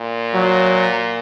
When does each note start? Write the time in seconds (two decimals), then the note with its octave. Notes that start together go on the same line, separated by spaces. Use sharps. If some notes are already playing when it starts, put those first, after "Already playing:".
Already playing: A#2
0.34 F#3